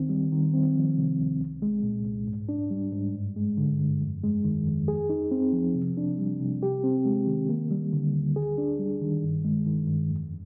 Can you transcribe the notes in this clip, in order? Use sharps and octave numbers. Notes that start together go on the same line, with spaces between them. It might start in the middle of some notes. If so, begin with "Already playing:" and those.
Already playing: D2 D#3 C4
G3
D#3
C4
F3
C3
D2
C2
G#3
A#2
C2
G#2
D4
G3
G#2
G2
G#3
D3
G2
F2
G#3
D#3
F2
G#4
D#4
C4
F3
C3
D4
G3
C3
G4
C4
G#3
D#3
A#3
G3
D3
D2
G#4
D4
G3
D#3
G2
G#3
D#3
G2
F2